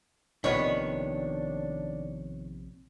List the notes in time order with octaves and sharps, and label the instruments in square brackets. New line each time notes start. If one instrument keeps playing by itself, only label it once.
[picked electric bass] A#1 C3 [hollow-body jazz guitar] D#3 B3 [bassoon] D4 [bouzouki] C#5